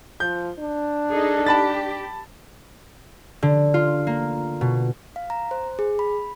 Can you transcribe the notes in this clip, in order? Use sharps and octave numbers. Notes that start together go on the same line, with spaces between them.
F3 G6
D4
D#4 G#4 A4
G4 A5 B5 A6
D3
F4
A#3
B2
F5
A#5
C5
G#4
B5